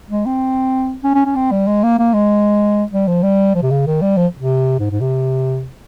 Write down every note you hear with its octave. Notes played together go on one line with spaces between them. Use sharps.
G#3
C4
C#4
C#4
C#4
C4
G3
G#3
A#3
A#3
G#3
G3
F3
G3
F3
C3
C#3
D#3
G3
F3
C3
G#2
G#2
C3